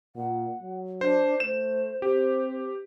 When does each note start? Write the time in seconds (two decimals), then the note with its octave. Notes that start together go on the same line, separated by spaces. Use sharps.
0.16 A#2 F#5
0.62 F#3
1.01 D4 C5
1.40 A3 C5 E7
2.02 C4 G4 C5